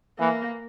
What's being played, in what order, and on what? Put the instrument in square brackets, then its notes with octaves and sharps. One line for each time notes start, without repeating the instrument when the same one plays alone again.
[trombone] E3 [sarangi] A#3